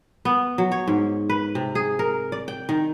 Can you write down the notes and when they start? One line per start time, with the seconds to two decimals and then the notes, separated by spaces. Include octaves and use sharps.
0.25 B3
0.58 F#3
0.72 C#5
0.88 G#2
1.29 B4
1.55 C3
1.75 G#4
1.99 A#4
2.32 D5
2.48 G5
2.69 D#3